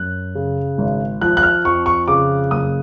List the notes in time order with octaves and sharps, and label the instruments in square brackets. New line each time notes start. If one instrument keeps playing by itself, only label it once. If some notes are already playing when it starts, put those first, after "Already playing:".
Already playing: [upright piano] F#2 F#6
C#3
G#1
F3 F#6
F#6
F6
F2 C#6
C#6
C#3 D6
F#1 D#6